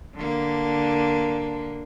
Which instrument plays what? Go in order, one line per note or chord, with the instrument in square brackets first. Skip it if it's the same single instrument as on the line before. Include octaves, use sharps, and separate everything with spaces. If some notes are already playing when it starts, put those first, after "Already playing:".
[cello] D3 A#3